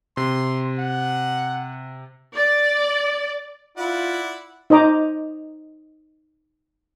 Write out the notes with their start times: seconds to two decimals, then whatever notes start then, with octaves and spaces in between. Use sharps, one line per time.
0.17 C3 C6
0.79 F#5
2.36 D5
3.77 E4 F4 D5 F#5
4.70 D#4 C5 D#5 A#5 D6